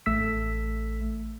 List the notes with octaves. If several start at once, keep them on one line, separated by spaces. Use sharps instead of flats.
A1 A3 E6 B6